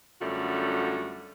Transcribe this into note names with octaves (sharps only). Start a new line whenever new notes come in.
F#2 D3 G3 A3 F4 F#4